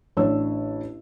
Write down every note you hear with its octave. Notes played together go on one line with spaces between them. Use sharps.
A1 D4 C#5 E6